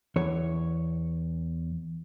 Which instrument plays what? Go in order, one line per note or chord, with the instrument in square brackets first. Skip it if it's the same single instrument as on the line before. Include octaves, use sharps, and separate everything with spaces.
[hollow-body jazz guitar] E2 C#5